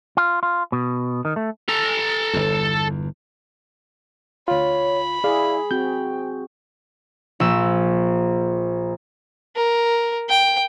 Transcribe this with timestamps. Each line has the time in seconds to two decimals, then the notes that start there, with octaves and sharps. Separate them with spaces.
0.17 F4
0.43 F4
0.72 B2
1.25 D#3
1.36 A3
1.69 A4 A#5
2.33 G1 E2
4.48 D2 F4 C#5 B5
5.24 E4 G#4 D5 F5
5.71 C4 F#4 G5 G6
7.40 A#1 E6
9.56 A#4
10.29 G5